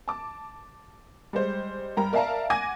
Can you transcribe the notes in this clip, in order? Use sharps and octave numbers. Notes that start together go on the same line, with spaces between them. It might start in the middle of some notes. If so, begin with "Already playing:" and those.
A5 D6
G3 G#3 C5
G2 A#4 G5 A#5
A#4 D5 E5 F5 A5 A#5
F#5 G#5 D6 G#6 A#6 D#7